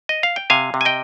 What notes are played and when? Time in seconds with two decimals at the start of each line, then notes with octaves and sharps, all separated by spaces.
0.09 D#5
0.23 F5
0.36 G5
0.50 C3 F5 G#5
0.74 C3
0.81 G#5
0.85 D#5 G5